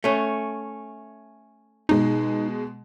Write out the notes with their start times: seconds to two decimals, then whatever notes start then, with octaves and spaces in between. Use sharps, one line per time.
0.04 A3 C#4
1.89 B2 G#3 D#4